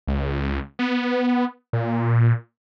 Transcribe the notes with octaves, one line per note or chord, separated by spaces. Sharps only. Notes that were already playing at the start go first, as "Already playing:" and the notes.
C#2
B3
A#2